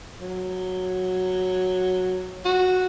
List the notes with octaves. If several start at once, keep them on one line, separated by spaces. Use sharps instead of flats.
F#3
F#4